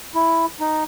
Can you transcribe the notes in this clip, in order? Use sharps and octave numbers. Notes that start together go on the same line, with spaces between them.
E4
D#4